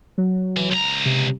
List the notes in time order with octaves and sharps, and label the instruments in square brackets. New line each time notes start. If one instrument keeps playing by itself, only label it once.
[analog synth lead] F#3
[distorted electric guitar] E3
C#2 A#5
[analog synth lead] C3